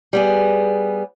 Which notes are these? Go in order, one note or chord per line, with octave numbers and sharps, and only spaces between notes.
G3 B3 G#4